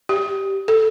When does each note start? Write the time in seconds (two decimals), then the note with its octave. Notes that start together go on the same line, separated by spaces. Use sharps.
0.09 G4
0.68 A4